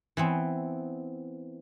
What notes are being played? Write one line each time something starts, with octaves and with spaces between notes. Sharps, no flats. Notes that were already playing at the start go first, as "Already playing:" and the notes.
E3 B3 C4